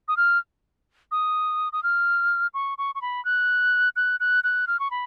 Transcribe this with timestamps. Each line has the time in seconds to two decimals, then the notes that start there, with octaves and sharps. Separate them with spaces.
0.08 D#6
0.17 F6
1.11 D#6
1.73 D#6
1.83 F6
2.54 C#6
2.78 C#6
2.95 C#6
3.02 B5
3.25 F#6
3.96 F#6
4.20 F#6
4.44 F#6
4.67 F6
4.79 C#6
4.91 B5